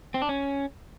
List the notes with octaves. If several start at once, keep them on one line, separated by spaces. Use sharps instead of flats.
C4
D4
C#4